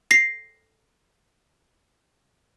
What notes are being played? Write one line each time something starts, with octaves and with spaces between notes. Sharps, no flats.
A#6 C7